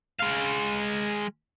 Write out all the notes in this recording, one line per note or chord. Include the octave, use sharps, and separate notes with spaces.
G#3 F5